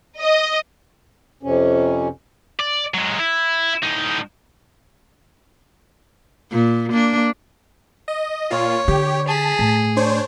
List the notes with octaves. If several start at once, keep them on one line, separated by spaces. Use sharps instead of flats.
D#5
F2 C3 C#4
D5
F#3 G#3
E4
A2 D#4
A#2
A#3 D4
D#5
A#2 F4 C#5
D3 G4
G#4 A5 B6
A2
D4 C5 C#5